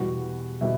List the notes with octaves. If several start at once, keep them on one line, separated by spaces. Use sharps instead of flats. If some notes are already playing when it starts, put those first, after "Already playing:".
Already playing: E2 B2 G3 F#4
B2 G3 E4